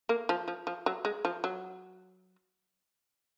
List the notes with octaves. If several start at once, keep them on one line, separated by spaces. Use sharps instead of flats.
A#3
F3
F3
F3
F#3
G#3
F3
F#3